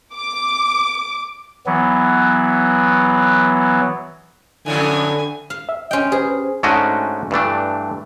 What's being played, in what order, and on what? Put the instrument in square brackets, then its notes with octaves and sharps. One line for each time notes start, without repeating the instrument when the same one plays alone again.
[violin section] D6
[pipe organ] E3 F#3 B3
[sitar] F2 A2 E3 [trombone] D3 [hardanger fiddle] G#5
[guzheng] F5
[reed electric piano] E5
[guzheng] C#4 G5 [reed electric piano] D#5 C6
[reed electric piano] G4 B4 C5 [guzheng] G#4
[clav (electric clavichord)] G#2 A3 C#4 D4 F#4 D#5
G2 E3 A3 D4